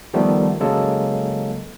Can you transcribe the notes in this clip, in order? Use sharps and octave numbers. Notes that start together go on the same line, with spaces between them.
D#3 F3 G3 A3 B3
C#3 F#3 G#3 A#3 A4